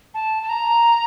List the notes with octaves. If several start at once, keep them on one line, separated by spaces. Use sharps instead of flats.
A5
A5
A#5